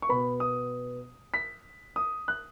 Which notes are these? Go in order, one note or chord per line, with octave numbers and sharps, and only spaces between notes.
C#6
B2 B3 B5
D#6
B6
D#6
F#6